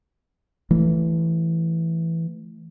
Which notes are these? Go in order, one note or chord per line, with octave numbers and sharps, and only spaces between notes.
E3 A3